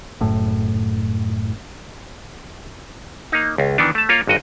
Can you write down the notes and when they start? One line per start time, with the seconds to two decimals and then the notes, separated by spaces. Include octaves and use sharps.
0.21 F#1 A2
3.32 A#3 D#4
3.58 C#2
3.78 D#3 E3 B3 D4
3.95 A3 A5
4.09 A#3 F4 C#5
4.27 G#1 G2 F#4 D#5